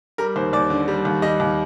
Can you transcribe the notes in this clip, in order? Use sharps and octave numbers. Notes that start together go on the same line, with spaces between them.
G3 A#4
D#2 C5
D#2 D5
D3
G3
D#2
G3 D#5
D#2